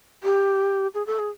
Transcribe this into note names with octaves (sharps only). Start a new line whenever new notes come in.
G4
G#4
A4
G#4